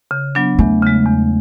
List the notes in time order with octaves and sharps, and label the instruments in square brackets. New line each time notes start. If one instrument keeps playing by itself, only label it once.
[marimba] C#3
F#3 B3 D4
[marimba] E2 [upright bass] A3
[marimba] C#3 G#3
E2